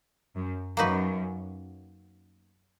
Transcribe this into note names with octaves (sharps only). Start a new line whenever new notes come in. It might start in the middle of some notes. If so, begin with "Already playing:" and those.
F#2
F#2 A#3 D#4 F#4 B4